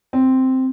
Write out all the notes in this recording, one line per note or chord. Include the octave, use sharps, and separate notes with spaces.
C4